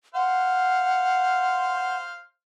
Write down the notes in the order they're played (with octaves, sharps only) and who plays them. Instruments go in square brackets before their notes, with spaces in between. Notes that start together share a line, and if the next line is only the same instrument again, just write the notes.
[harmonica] C5 F5 [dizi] F#5